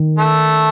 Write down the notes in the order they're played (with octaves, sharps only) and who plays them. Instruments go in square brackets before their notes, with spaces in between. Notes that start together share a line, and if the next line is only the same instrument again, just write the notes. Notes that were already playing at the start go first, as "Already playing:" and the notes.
Already playing: [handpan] D#3
[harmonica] A3